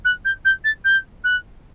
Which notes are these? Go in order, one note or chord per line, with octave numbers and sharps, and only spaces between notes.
F#6
G6
G6
A6
G6
F#6